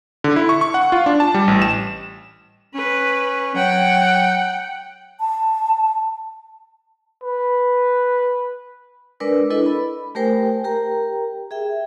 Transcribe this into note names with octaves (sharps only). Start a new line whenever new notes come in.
D3
E4
C#6
C#6
F#5
F4
D4
A5
G3
A1
E7
C#4 B4
F#3 F#5 G5
A5
B4
G#3 D4 A#4 B4 D5 E6
D4 E4 A4 B4 D#5
B5
A3 G4 A#4 C5 G5 G#5
G4 A#4 G5 A#5
G#4 E5 G5